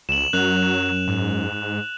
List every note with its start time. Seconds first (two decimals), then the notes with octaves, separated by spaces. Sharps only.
0.09 C#2 E7 F#7
0.33 F#2 F#3 F#6 F7
1.08 G#2